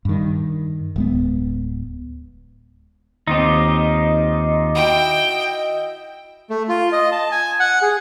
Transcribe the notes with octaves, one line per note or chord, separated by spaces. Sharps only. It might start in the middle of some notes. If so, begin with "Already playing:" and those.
G2 D#3
D1 G#3 B3
D#2 C4 D#4 F4 G4 D#5
E4 F#4 G5
A3
F4
D#5
A5
G#5
F#5
G#4